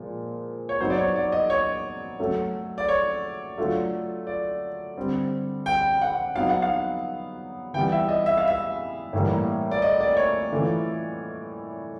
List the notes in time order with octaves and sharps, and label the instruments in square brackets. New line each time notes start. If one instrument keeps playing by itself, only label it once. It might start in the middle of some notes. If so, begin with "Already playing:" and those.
Already playing: [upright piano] A#2 F3 G#3
[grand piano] C#5
[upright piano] F#3 B3 D#4 [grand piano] C5
[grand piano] D5
C#5
D5
D#5
C#5
[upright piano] F#3 A3 C#4
[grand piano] D5
C#5
[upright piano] F#3 A3 D4 F4
[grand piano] D5
[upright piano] D3 G3 C4
[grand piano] G5
F#5
[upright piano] F#3 B3 D#4 [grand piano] F5
[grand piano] F#5
F5
[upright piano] E3 G3 B3 [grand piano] G5
[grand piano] E5
D#5
E5
F5
E5
[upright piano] A2 E3 G3 A#3
[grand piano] D5
D#5
D5
C#5
[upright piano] E3 A3 C#4 F4